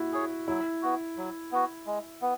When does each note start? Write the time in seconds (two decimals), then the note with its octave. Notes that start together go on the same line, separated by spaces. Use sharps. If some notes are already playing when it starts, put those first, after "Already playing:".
Already playing: E4 F#4
0.13 G#4 C#5
0.48 F#3 E4
0.82 B3 F#4
1.17 F#3
1.52 B3 F#4
1.87 G#3
2.22 B3